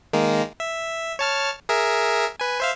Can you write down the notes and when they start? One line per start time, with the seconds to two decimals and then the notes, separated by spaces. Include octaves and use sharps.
0.13 D#3 G#3 A#3
0.60 E5
1.19 C#5 A5 F6
1.69 G#4 A#4 E5
2.40 B4 G#5
2.60 C5 E5 F5